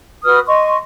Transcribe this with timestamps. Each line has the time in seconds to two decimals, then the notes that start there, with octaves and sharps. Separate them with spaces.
0.24 F#4 B4 D#6 F6
0.47 D#5 C6 C#6